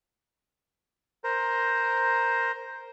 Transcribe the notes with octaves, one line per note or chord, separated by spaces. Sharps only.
A#4 C5